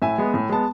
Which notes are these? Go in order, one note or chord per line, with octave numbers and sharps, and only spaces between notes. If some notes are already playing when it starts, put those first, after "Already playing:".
A2 E5 G#5
G#3 B3
A2
G#3 B3 A5